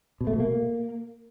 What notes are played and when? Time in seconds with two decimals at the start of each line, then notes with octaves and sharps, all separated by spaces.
0.21 B2
0.27 A3
0.33 B2
0.40 A#3